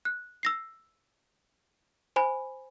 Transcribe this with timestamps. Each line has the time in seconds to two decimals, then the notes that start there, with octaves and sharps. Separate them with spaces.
0.05 F#6
0.43 E6 A#6 C7
2.16 C5 G#5 B5